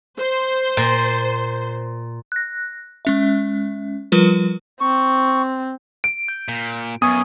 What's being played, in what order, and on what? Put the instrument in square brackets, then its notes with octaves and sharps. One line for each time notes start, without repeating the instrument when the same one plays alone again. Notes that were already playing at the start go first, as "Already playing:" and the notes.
[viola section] C5
[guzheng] A#2
[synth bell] F#6 A#6
G#3 C#4 E5
F3 G3 F4 A#4 B4
[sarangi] C4 [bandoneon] C#6
[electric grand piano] D7
[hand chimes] G6
[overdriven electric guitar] A#2
[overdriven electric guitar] F#2 [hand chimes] B3 G#5 C#6 [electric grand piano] D#6